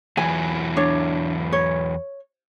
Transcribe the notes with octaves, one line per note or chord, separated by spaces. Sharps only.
E2 E3 F#3 G#5
D4 C#5
C#5